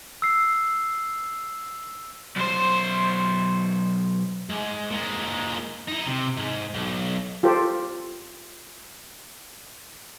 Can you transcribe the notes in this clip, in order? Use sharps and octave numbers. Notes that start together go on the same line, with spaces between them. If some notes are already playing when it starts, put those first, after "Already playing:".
E6 C7
B1 C5
G#2
A#2 G#3
D#4 E4
C3
G#2
B1
F4 G4 A4 C5